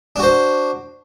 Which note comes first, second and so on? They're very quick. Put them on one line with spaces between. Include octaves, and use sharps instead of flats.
D4 F#4 C5